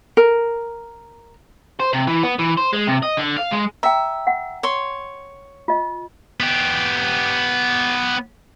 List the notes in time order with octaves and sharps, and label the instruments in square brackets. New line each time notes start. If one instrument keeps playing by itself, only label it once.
[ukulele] A#4
[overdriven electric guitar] C5
C3
E3
B3
E3
C5
G#3
C3
D#5
D3
F5
G#3
[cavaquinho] E5 [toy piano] G5 A#5
[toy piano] F#5
[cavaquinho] C#5 C6
[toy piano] F4 D#5
[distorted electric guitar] B3 G4